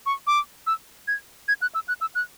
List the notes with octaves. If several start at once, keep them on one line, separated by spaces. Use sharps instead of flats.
C#6
D6
E6
G#6
G#6
F#6
E6
F#6
E6
F#6